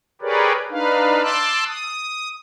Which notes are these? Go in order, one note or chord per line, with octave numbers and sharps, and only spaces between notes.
G4 G#4 A#4 B4 C#5 D5
D4 D#4 B4 F5
A5 C6 D6 E6 F#6
D#6